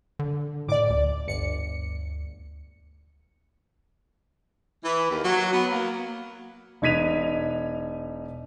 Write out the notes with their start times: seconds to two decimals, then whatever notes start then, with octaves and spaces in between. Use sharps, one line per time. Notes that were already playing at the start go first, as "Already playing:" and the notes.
0.19 D3
0.69 A2 D5 D6
0.90 D2
1.27 G1 C#7
4.84 E3
5.09 D#2
5.23 F#3
5.52 B3
5.71 A#3
6.82 E1 D#4 G#6 B6 D#7 F7